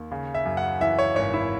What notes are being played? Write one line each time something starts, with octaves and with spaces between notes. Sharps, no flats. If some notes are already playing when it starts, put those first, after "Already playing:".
Already playing: D#2
C#3
E5
F#2
F#5
E3 E5
C#5
G#1 C#5
E4